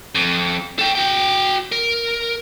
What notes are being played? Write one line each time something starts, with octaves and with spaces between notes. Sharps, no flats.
F2
A4 G5
F#4 G5
A#4